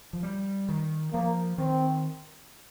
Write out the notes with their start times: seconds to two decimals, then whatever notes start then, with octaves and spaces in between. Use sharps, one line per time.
0.13 F3
0.23 G3
0.69 D#3
1.13 F3 A#3
1.58 D#3 C4